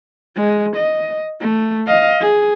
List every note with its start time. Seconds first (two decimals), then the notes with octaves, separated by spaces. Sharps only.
0.36 G#3
0.76 D#5
1.40 A3
1.87 D#5 F5
2.20 G#4